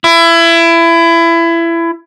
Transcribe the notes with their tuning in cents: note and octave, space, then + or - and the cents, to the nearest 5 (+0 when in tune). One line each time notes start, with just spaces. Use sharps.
E4 +25